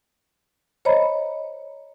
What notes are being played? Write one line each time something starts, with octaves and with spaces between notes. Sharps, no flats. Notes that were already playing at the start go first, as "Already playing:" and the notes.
C5 C#5 D#5 A#5 B5